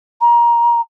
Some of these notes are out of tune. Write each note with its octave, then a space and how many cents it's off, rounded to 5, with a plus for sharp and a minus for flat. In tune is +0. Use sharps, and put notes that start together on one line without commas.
A#5 +20